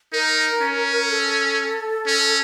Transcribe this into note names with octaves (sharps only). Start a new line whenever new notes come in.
D#4 A#4
C#4
A4
C#4